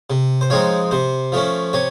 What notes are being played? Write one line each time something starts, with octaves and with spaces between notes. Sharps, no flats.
C3
C5
F3 G#3 C4 D#4 C#5
C3 C5
F3 A3 C#4
C3 C#5